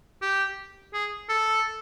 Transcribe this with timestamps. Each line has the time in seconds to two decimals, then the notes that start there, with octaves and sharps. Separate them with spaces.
0.22 G4
0.93 G#4
1.29 A4